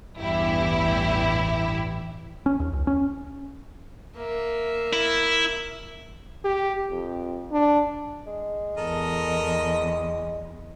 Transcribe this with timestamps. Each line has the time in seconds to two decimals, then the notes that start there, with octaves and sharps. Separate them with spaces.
0.17 A1 E2 G2 E3 E4 G4
2.46 C#4
2.60 D#2
2.73 C#2
2.87 C#4
4.17 A#3 E5
4.93 E4
6.44 G4
6.89 F2
7.52 D4
8.27 G#3
8.78 E2 A4 A#4 D#5